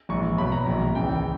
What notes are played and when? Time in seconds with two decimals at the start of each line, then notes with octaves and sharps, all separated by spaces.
0.09 A#1 G#2 E3 C#6
0.37 B1 B2 B5
0.52 A#5
0.66 A#1 G#2 D#3
0.95 C#2 C#3 E3 G5